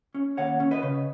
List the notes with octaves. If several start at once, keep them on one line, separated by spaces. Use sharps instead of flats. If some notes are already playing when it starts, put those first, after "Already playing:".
C#4
D#2 C#5 F#5
C#4
B4 D#5
C#3